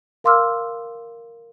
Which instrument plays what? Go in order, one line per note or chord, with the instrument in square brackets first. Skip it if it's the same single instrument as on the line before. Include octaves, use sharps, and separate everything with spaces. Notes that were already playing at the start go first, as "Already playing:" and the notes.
[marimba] A#4 F5 C6 D6 E6 F6